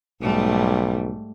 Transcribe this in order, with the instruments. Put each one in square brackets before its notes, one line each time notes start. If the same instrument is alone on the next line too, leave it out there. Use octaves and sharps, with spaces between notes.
[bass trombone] B1 [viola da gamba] G#2 G3 A3